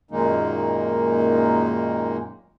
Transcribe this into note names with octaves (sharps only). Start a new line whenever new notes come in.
F#2 A#2 D#3 G#3 A#3 D#4